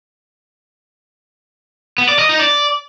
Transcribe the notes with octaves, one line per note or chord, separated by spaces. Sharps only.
B3
D5
D#5
D#4
D5